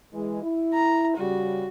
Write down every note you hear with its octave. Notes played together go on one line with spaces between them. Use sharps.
E3 G#3
E4
A#5
C#3 G3 F#4